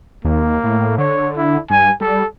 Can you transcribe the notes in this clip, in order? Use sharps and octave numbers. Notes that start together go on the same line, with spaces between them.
D#2 A#3
A2
D3 C#5
E4
G2 G#5
G3 A4